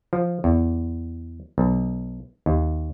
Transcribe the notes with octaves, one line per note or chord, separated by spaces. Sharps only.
F3
E2
B1
D#2